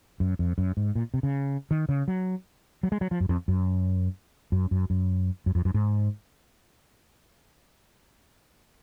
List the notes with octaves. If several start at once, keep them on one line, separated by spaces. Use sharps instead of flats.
F#2
F2
F#2
G#2
A#2
C3
C#3
D#3
C#3
F#3
F#3
G#3
F#3
F3
F#2
F2
F#2
F#2
F#2
F#2
F#2
F2
F#2
G#2